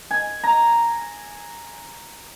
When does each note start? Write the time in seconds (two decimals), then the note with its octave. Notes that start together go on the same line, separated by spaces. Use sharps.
0.11 G#5
0.44 A#5